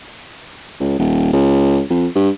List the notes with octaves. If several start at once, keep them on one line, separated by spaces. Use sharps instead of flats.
C#2
D#1
C#2
F2
G2